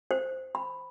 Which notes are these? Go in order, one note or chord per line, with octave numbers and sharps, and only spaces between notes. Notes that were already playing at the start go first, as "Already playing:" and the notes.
C5
B5